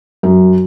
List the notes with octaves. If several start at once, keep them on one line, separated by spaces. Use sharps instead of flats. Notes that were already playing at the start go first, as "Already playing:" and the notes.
F#2